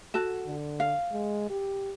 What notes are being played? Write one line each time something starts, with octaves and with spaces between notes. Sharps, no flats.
F#4 A4 A5
D3
F5
G#3
G4